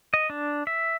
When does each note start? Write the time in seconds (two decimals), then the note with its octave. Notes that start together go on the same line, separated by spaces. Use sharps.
0.14 D#5
0.30 D4
0.67 E5